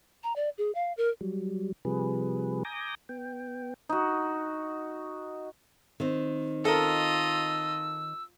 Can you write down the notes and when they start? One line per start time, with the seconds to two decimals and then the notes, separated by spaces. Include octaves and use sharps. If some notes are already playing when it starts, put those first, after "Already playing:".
0.24 A#5
0.36 D5
0.58 G#4
0.75 F5
0.97 A#4
1.21 F#3 G3
1.85 C3 F3 G3 G#4 B4
2.65 G#5 A#5 D6 D#6 G6 A#6
3.09 B3 G5
3.89 D#4 F#4
6.00 D#3 C4 D#4
6.65 F4 A4 A#4 D#5 E6